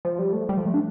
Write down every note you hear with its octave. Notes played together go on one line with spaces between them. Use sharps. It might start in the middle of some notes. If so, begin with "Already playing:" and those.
F3
G3
A3
G3
F3
A3
D4